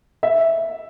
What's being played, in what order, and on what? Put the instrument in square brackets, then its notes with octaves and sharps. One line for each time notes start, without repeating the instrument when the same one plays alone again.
[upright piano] E5